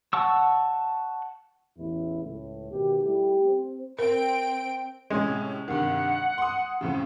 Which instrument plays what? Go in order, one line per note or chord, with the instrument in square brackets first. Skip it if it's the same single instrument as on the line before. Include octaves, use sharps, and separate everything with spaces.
[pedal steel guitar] F#5 A5 C#6 E6
[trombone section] A1 E2 E4
C#2 A2
B2 D#3 G4
[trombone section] G3 A3 E4 [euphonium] G4
[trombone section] C4
[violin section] C4 G5 D7 [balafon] A#4
[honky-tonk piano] A2 C3 C#4 [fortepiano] G#3
[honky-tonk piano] G2 C3 D#3 [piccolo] F#5
[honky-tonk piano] C6 D#6
F2 A2 C#3